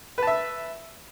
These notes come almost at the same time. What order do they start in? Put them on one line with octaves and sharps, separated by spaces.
B4 A5 E5